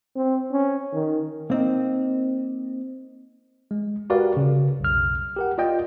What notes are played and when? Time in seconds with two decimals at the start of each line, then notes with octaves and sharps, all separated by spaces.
0.16 C4
0.52 C#4
0.93 D#3
1.50 A#3 C4 D#4
3.71 G#3
4.10 F#4 G4 A#4 B4 D5 F5
4.37 C#3
4.80 B1 F2 F6
5.36 G4 A#4 F#5
5.58 F4 D5 D#5 G5